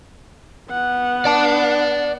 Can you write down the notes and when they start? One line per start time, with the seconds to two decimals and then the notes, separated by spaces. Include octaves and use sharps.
0.70 B3 F#5
1.25 D5 A5